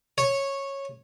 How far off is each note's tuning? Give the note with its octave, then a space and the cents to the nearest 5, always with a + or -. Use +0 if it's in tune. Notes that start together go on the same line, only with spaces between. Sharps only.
C#5 -10